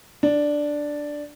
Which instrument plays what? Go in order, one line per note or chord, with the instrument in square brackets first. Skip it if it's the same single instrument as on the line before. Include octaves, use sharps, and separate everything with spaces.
[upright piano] D4